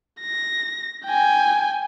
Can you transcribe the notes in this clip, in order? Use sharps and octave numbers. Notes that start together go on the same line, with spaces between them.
A#6
G5 G#5